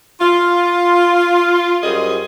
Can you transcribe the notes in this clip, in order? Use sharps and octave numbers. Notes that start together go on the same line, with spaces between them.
F4
F#2 G3 G#4 C5 D#5